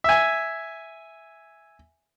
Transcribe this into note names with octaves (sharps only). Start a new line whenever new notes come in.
E5 G#5